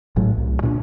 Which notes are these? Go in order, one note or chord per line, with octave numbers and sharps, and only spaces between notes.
A1 A2 F#3 A3
C2
A#2 C#4 D4